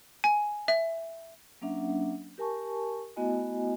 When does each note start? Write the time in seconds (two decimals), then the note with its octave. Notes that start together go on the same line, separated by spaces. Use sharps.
0.24 G#5
0.68 E5
1.61 F#3 A#3 C#4 D4 E5 F#5
2.38 G4 A#4 G#5 A5 C#6
3.17 A3 B3 E4 F#4 D#5 G#5